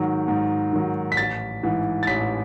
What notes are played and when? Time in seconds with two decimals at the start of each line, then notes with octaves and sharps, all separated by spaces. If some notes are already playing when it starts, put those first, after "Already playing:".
Already playing: G#2 D#3 F#3
0.28 G#2
0.73 D#3 F#3
1.12 B6
1.17 A1 A6
1.63 G#2 E3
2.03 A6
2.07 A1 B6